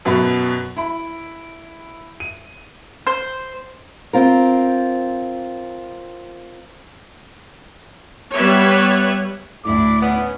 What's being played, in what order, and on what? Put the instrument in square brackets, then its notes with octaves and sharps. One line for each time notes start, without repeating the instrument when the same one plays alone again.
[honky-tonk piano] F#2 B2 F#4 B5
E4 B5
D#7
[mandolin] C5
[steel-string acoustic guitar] C4 F4 A#4
[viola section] G3 B3 B4 C#5 E5
[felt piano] D2 A2 [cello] D4 E4 [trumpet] D6
[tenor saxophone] B3 [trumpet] C#4